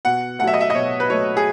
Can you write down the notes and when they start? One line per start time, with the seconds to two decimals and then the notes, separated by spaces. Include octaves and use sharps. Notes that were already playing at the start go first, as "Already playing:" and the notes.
0.05 B2 F#5
0.39 A3 F#5
0.44 F#3 E5
0.54 D#5
0.61 E5
0.70 D#5
0.75 B2 C#5
1.00 B4
1.10 F#3 A3 C#5
1.37 G#4